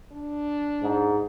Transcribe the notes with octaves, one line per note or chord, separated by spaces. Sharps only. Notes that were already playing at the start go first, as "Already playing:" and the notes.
D4
G#2